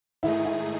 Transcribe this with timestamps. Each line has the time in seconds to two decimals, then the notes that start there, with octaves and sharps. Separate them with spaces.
0.23 G#2 D#3 A3 D#4 E4 G#4
0.45 E4